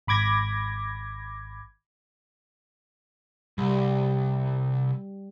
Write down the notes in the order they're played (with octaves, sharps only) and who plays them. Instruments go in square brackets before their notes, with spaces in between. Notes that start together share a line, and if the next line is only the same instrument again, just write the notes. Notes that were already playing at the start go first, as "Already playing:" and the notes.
[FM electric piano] G#1 B5 D6 G#6 A#6
[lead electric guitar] C2 [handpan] G3